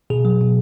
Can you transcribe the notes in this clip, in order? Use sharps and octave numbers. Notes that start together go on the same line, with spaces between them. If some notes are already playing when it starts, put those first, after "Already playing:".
B2 G#4
F#3
B2